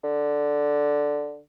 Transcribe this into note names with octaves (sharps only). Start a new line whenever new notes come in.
D3